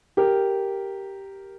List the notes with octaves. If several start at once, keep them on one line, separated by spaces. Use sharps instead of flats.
G4 A#4